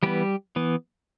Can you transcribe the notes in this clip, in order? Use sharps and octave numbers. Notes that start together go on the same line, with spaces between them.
E3 G3 B3 G4
E3 B3